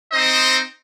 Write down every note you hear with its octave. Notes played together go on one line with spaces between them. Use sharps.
C4 D#4 C5 D#5